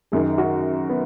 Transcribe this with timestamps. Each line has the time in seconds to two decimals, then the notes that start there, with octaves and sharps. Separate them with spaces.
0.12 F#2 D#3 G#4
0.38 F#4
0.90 B3